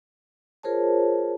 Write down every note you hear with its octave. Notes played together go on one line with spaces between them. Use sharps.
F4 G#4 A#4 C5 C#5 A5